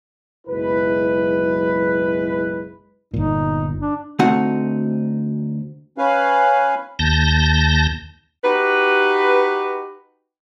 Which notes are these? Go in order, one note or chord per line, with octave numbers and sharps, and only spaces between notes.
F#1 B1 G#3 E4 B4
G1 A#2 D#4
D4
D2 A3 C4 D#4 F#4 F#5
C#4 B4 F5 G#5
D#2 A5 G6 A#6
D#4 F#4 G4 B4